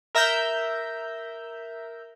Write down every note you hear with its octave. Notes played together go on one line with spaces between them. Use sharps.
A#4 E5 A#5 E6 G6